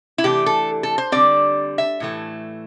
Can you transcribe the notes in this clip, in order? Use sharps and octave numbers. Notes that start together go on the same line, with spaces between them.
E4
C3 E3 A3 D4 G4
A4
A4
C5
D3 G3 C4 D5
E5
A2 E3 A3